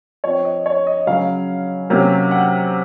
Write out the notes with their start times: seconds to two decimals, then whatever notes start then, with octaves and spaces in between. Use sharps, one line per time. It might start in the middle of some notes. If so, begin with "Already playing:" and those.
0.24 F3 C4 C#5
0.45 D#5
0.66 C#5
0.87 D#5
1.07 C#3 F#3 C#4 F5
1.90 C3 F#3 A#3 C#4
2.31 F#5